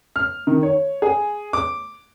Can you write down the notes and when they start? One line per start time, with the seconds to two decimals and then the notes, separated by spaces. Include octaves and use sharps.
0.16 F6
0.47 D#3
0.63 C#5
1.02 G#4
1.53 D6